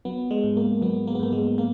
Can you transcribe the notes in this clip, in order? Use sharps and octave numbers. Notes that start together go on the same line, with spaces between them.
F#3 B3
G#3
G#2
A#3
F#3 B3
A#3
B3
G#2 A#3
G#3
A#3